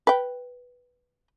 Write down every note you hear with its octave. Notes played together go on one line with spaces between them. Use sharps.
B4 G5